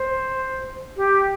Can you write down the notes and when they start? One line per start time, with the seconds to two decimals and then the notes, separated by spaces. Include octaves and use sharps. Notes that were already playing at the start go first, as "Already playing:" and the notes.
Already playing: C5
0.97 G4